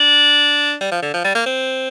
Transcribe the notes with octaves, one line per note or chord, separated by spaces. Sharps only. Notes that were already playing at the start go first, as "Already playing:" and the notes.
Already playing: D4
G3
F3
D3
F3
G3
A#3
C4